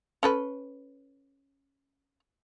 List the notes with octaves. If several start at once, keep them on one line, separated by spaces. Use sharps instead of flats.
C#4 A4 B4